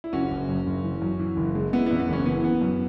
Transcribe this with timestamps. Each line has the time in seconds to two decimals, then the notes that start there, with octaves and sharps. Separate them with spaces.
0.04 E4
0.13 F#1 C#4 F#4
0.31 F#1
0.49 F#2
0.66 F#1
0.84 E3
1.02 F#2
1.19 E3
1.37 F#1
1.55 G#3
1.73 G#3 B3 E4
1.86 E2 B3 E4
1.99 B3
2.08 F#1 C#4
2.26 E3 B3
2.44 B3
2.61 F#2